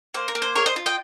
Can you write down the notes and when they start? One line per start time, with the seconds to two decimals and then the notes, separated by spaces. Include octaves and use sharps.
0.14 A#3 C5
0.28 A#4
0.35 A#3
0.42 C5
0.55 G#4 A#4 C#5
0.66 C5 D#5
0.76 F4
0.86 D#5 G5